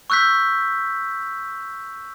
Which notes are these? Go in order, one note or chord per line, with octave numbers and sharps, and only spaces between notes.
C#6 E6 F#6 G6 B6